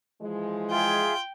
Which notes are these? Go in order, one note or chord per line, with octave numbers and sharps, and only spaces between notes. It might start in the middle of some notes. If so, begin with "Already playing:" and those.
E3 F3 G#3
F4 G#4 E5 G5